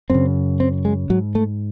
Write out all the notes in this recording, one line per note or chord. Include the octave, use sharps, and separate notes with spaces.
F#2 C#3 C4
C4
G#3
G#2 F#3
A3